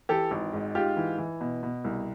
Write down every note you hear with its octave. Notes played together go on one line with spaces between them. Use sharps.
E3 G4 A4
G#1
G#2
G#2 F4 G4
E3
E3
B2
B2
C2